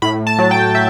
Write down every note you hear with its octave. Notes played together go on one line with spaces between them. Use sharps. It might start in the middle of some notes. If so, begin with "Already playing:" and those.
A2 B5
A5
F#3
G5
E5